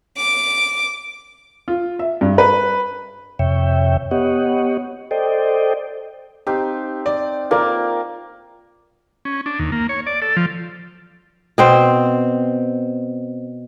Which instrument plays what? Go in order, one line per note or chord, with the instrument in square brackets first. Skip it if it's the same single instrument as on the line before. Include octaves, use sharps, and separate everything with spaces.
[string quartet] D6
[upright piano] F4
E5
G2
B4
[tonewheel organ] F2 C3 C#5 E5 G5
B3 G4 C#5 D#5 F#5
A4 C5 D5 D#5 G5
[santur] C4 D#4 F5 [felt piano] G4
[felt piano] D5
[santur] A#3 [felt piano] F4 A#4 D5
[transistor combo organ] C#4
D4
D#2
A#3
C#5
D5
A4
F3
[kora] B2 C4 C5